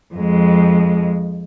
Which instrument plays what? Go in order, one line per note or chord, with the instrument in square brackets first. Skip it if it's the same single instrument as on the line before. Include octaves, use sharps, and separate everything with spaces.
[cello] F2 G#3